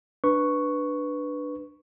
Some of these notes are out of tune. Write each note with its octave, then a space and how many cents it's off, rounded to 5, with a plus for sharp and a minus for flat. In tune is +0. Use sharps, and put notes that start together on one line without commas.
D4 +5 B4 +0 C#6 +0